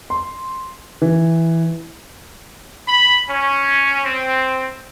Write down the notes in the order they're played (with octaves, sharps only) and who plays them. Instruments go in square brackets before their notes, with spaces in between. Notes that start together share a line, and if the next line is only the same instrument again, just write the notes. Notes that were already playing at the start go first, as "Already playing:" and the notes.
[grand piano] C6
E3
[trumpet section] B5
C#4
C4